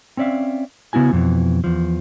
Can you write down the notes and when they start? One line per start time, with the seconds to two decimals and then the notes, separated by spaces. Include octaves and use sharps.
0.17 C4 C#4 D5 E5 F5
0.93 C#3 B3 E4 F#4 G#5
1.13 F2 B2 E3
1.64 E2 F3